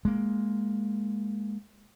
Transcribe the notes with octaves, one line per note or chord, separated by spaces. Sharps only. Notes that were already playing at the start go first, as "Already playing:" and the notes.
G#3 A#3